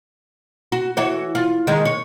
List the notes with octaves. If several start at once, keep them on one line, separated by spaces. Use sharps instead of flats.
F#4
E3 F#4 C#5
F4
D#3 G#3
C#5